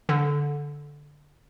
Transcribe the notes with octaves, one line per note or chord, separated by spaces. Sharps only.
D3